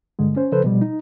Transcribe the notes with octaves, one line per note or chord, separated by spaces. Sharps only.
G2 D3 G#3
C#4 C5
C#3 F3 A4 B4 C5
B2 F3 G3
D#4